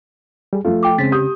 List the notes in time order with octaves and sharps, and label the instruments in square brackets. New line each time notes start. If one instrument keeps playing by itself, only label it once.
[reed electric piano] G3 G#4
[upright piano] F3 A3 [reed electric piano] F4
[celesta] G5 D6
[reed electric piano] C#3 C#4 [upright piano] G#3 C4 [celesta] A6 B6
[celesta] G4 [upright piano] D#6 G6